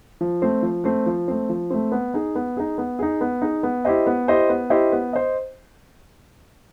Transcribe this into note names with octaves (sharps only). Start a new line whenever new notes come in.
F3
A3 C4
F3
A3 C4
F3
A3 C4
F3
A3 C4
B3
D#4 G#4
B3
D#4 G#4
B3
D#4 G#4
B3
D#4 G#4
B3
E4 G4 C5 D#5
B3
E4 G4 C5 D#5
B3
E4 G4 C5 D#5
B3
C5 D#5